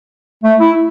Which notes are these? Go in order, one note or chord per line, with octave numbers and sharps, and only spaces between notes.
A3
E4